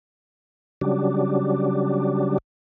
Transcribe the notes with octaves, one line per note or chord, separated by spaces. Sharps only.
C#3 F#3 G3 D4